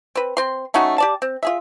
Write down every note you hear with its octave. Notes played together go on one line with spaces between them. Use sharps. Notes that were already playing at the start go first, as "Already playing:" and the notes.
C4 B4
C4 C6
A3 C#4 D#4 F#4
G4 D5 A5
C4
F4 G#4 E5